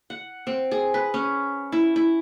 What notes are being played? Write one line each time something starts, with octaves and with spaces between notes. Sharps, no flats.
F#5
C4
G#4
B4
C#4
E4
E4